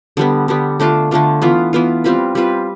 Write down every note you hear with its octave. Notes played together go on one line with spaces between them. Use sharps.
D3 G3 B3
D3 G3 B3
D3 A3 D4 F4
D3 A3 D4 F4
E3 B3 F4
E3 B3 F4
G3 C4 F4 B4
G3 C4 F4 B4